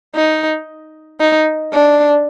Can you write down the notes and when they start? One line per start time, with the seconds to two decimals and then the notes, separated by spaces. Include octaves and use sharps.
0.15 D#4
1.21 D#4
1.73 D4